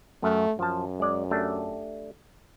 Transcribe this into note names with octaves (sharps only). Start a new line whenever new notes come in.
F#2 A3
F#2 F3 A5
G#3 D5
A3 D4 G4